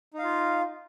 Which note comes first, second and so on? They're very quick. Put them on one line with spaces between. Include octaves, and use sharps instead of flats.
D#4 F5 F4